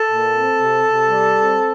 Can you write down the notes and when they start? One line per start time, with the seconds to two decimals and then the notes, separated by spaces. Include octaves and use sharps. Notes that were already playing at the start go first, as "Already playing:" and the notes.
Already playing: A4
0.09 A#2
0.34 C4
0.59 C3
0.84 C3
1.08 G3
1.34 C4